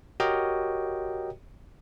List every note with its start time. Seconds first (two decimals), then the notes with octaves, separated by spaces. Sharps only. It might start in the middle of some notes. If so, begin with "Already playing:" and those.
0.20 F#4 G4 A#4 C#5 D#5 G5